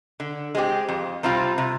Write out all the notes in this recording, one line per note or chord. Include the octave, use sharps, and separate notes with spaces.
D3
G#3 C4 G4
F2
C3 G3 C4 F4
C3